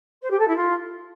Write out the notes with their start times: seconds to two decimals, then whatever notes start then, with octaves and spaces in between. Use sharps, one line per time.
0.22 C5
0.30 G4
0.39 A4
0.47 E4
0.56 F4